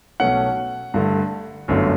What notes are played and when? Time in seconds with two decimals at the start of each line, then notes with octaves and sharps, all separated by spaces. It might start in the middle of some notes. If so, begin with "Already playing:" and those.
0.20 B1 B2 A3 C#4 F#5
0.94 G2 D3 A3
1.68 G1 F#2 D3 A3 C#4